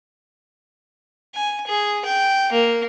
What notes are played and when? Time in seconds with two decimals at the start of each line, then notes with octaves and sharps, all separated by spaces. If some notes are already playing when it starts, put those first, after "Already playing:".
1.35 G#5
1.67 G#4
2.05 G5
2.52 A#3